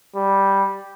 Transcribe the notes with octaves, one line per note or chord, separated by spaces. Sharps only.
G3